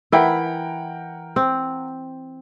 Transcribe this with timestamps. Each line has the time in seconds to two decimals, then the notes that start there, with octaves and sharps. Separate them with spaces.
0.12 E3 E4 A#4 F#5 G5
1.36 C4